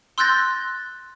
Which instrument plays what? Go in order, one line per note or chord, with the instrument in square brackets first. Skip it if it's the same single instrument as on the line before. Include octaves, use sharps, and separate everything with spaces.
[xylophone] C6 E6 F#6 G6 A6 A#6